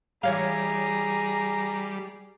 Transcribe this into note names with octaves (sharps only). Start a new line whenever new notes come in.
E3 G3 G#4 C#5 F5 A#5